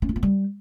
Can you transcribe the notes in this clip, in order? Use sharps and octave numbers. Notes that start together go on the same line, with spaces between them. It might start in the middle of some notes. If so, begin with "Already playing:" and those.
C#4
F4
B3
G3